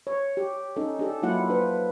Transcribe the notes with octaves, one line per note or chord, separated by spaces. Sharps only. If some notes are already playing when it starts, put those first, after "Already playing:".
C#5
G4
C#4 D#4 A4
D4 G4 A4
F#3 A#3 E4 F4 F#5
D4 B4 C5